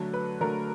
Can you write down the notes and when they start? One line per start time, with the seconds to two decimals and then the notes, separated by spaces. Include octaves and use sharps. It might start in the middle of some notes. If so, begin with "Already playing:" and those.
Already playing: D3 F#3 A3
0.13 B4
0.41 D3 F#3 A3 A#4